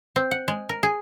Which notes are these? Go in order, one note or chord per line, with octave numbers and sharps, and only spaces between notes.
C4
F#5
G#3
A#4
G#4